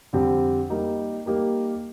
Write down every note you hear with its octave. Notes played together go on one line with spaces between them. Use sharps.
F2 D3 G3 C4 G4
G3 A#3 D#4 G4 A#4
G3 A#3 D#4 G4 A#4